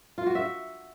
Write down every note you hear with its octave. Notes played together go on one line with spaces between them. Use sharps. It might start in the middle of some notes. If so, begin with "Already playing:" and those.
F4
F#4
E5